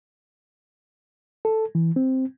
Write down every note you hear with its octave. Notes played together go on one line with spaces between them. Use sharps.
A4
E3
C4